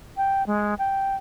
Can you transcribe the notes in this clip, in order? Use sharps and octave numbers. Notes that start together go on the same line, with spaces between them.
G5
G#3
G5